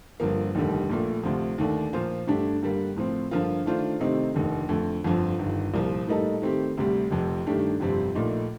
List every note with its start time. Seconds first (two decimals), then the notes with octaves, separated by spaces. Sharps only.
0.20 G1 G2 F3 A#3
0.55 F1 D#2 D3 G3
0.90 A#1 A#2 A3
1.23 D2 C3 F3
1.58 D#2 D3 A3 D4
1.93 A#2 F3 A#3 F4 C5
2.27 G2 D3 A3 D4 G4
2.62 G2 D3 G3 A#3
2.97 A2 F3 C4
3.31 G2 D3 F3 A#3 F4
3.66 D#3 A3 D4 F4 C5
4.00 C3 D#3 A3 C4 D#4
4.34 F1 D#2 D3
4.69 F2 D3 A3
5.04 G1 F2 D3 F3
5.39 G1 G2 D#3
5.74 C2 A#2 F3
6.07 A2 G3 A#3 D#4 A4
6.42 D#3 A3 C4 G4
6.77 D2 C3 G3
7.11 F1 F2 C3
7.46 G2 D#3 A3 D4 G4
7.80 G1 F2 C3 G3 C4
8.15 A#1 A#2 A3 D#4